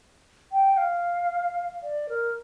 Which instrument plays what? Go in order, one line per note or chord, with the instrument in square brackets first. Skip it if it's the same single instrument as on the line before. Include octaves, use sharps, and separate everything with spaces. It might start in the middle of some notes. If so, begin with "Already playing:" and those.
[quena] G5
F5
D5
A#4